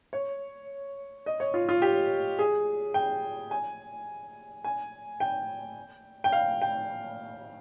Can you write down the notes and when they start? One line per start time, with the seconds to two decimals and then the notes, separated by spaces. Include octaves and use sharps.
0.13 C#5
1.26 D#5
1.40 C#5
1.54 F4
1.69 F4
1.82 G4
2.39 G#4
2.94 G5
3.51 G#5
4.64 G#5
5.20 G5
6.24 G5
6.32 F5
6.62 G5